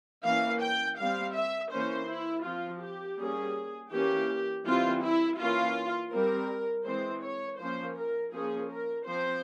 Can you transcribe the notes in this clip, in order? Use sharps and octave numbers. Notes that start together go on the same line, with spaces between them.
E3 A#3 C#4 F5
G5
G3 C4 F5
E5
E3 A#3 C#4 C5
E4
F3 C4 F4
G4
G3 A#3 C#4 G#4
E3 A#3 C#4 G4
E3 G3 C4 F4
E4
E3 A#3 C#4 F4
G3 C4 A#4
E3 G#3 C4 C5
C#5
F3 A#3 C#4 C5
A#4
F3 A#3 C#4 G#4
A#4
F3 C4 C5